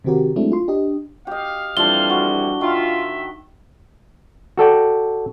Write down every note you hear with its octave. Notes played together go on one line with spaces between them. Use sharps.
C3 D#3 C4 F#4 G4 A#4
F#3 G#3 A3 C4 D4 E4
F4 C6
D4 G4 D#5
G4 D#5 F5
F2 E3 G3 D4 F4 G7
F#4
D#3 F4 E5
F#4 A4 D5 G5